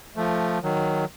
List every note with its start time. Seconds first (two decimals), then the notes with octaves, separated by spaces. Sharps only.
0.16 F3 A3
0.63 D#3 F#3